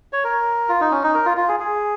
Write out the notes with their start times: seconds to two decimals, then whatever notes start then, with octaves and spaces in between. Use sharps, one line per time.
0.13 C#5
0.24 A#4
0.69 F4
0.81 D#4
0.91 C#4
1.03 D#4
1.15 A#4
1.26 F4
1.37 F4
1.48 G#4
1.60 G#4